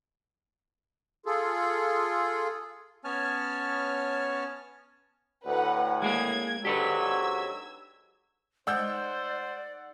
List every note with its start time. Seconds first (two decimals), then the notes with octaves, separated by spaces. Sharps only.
1.26 F4 G#4 A4
3.04 B3 C#4 C#5 G#5 A5 F6
5.45 D2 A2 B4 F#5 A#5
6.02 G#3 A#3 G#4 G#6
6.65 G#2 F#3 D4 G4 A4 B4 E6 G#6
8.67 G#3 D#4 C5 D5 F#5 E6 G6